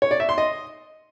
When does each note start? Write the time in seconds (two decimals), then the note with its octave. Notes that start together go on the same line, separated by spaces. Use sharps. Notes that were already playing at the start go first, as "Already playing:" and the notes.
0.02 C#5
0.11 D5
0.20 E5
0.29 C6
0.38 D#5